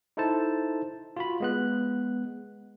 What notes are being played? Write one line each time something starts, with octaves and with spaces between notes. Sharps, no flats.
D#4 E4 A4 C5 A5
F4 F#4 B5
G#3 B3 F#6